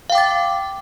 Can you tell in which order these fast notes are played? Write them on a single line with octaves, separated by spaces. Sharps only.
F5 G5 D6 A6